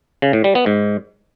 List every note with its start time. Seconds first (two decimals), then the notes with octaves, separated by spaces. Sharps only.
0.22 C#3
0.33 A2
0.44 G3
0.55 B3
0.66 G#2